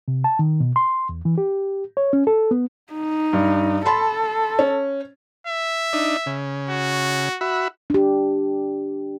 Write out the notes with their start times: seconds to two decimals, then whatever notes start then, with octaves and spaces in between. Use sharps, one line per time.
0.08 C3
0.24 A5
0.39 D#3
0.60 B2
0.76 C6
1.09 E2
1.25 E3
1.38 G4
1.97 C#5
2.13 C#4
2.27 A4
2.51 B3
2.93 D#4
3.33 G2
3.86 A4 A5 B5 C6
4.59 C#4
5.47 E5
5.93 D4 D#4
6.26 C#3
6.70 F#4
7.41 F#4 E5 B5
7.90 D4 G4